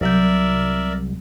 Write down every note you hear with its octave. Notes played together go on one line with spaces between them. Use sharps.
C2 F#3 A#4 D5 E5 G6